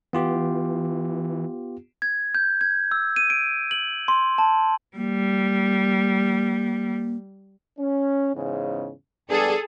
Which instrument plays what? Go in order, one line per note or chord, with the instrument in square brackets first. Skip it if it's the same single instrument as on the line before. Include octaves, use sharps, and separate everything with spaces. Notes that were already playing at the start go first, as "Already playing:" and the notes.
[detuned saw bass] E3 [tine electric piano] B3 F4 G4
[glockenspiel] G#6
G6
G#6
E6
D#7
D7
F#7
C6
A5
[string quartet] G3 [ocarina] A#3
[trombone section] C#4
E2 G#2 C#3
[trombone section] G3 B3 D4 [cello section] G#4 A4